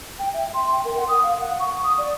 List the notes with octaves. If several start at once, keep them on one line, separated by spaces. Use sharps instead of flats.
G5
E5
C6
G5
A#4
F#5
D#6
F5
F#5
C#6
D#6
D5